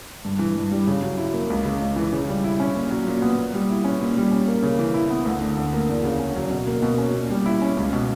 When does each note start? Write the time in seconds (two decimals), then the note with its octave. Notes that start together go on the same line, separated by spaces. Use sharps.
0.25 G2
0.39 E3
0.56 G2
0.71 G3
0.87 C#3
1.02 F#3
1.18 E4
1.34 A#3
1.50 C#2
1.65 C#3
1.81 C#2
1.96 E3
2.12 C#3
2.29 G3
2.44 E4
2.60 C#4
2.75 A#2
2.91 F#3
3.07 A#2
3.22 B3
3.37 A#2
3.54 G3
3.69 E4
3.84 C#4
4.01 A#2
4.17 G3
4.31 C#4
4.48 A#3
4.63 C#3
4.79 E3
4.94 E4
5.10 B3
5.26 D2
5.41 D3
5.57 D2
5.73 A#3
5.89 E2
6.04 C#3
6.20 C#4
6.36 F#3
6.51 B2
6.67 A#3
6.82 B2
6.98 C#4
7.14 A#2
7.30 G3
7.46 E4
7.62 C#4
7.77 C#2
7.93 B2